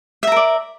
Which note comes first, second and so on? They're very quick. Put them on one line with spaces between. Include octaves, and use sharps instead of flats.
E5 A#5 A#4 D5